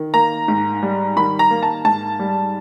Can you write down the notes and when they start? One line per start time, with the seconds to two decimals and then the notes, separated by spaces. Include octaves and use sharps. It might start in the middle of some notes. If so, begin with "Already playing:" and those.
Already playing: D#3
0.14 A#3 A#5
0.48 G#2
0.82 G3
1.16 D#3 B5
1.39 A#5
1.51 A#3
1.63 A5
1.85 G#2 A5
2.19 G3